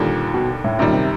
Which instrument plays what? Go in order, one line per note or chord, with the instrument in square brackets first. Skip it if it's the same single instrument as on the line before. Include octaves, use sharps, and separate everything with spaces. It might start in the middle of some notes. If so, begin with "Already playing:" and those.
Already playing: [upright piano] D#2 D3 G3 [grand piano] A#2
[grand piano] B2
A2
[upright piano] F#2 D#3 G3 [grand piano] A#2
[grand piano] C3